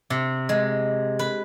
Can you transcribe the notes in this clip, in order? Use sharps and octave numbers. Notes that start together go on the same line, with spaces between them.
C3
G#3
B4